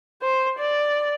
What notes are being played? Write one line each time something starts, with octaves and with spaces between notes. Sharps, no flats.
C5
D5